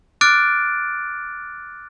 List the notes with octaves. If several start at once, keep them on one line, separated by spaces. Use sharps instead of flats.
D6 F6 F#6 A6 D7